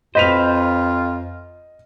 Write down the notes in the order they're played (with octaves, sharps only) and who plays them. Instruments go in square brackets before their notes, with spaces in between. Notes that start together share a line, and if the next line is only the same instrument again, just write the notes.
[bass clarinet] F2 [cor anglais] F4 [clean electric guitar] B4 C5 [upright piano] D#5 F7